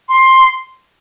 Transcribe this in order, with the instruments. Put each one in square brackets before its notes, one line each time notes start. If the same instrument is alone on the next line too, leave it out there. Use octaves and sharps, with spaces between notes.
[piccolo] C6